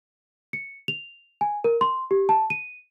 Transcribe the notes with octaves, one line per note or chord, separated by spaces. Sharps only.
C#7
F7
G#5
A#4
C6
G4
A5
D#7